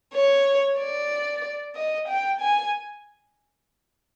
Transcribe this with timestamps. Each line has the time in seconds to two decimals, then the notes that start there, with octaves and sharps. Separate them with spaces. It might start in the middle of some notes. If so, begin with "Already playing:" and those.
0.13 C#5
0.78 D5
1.75 D#5
2.09 G5
2.41 G#5